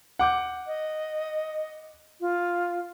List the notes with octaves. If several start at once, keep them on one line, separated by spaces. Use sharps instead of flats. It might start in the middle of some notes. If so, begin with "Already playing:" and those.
F#5 D6 G6
D#5
F4